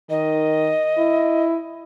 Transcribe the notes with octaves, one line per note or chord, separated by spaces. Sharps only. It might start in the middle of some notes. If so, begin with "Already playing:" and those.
D#3 D#5
E4